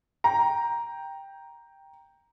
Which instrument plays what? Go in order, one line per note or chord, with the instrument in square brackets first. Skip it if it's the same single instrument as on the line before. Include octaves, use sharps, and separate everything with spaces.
[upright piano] G5 A#5